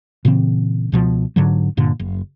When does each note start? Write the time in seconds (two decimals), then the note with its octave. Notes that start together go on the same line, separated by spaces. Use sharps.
0.25 A#2 C#3 E3 C4
0.92 C#2 B2 F3
1.36 G#2 D3 F#3
1.77 G2 A#2 D3
2.00 F#1